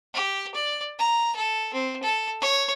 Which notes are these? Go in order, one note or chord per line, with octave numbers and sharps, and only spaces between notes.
G4
D5
A#5
A4
C4
A4
C#5